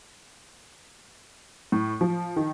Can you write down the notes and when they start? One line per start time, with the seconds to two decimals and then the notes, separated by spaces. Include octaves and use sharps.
1.72 A2
2.01 F3
2.36 D#3